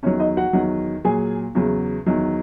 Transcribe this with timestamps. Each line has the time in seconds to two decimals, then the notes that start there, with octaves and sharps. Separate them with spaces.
0.03 E2 D#3 F#3 C#4 C#5
0.20 D#4 D#5
0.37 F#4 F#5
0.53 E2 D#3 F#3
1.05 A#2 F#3 G#4 G#5
1.55 E2 C#3 F#3
2.06 E2 D#3 F#3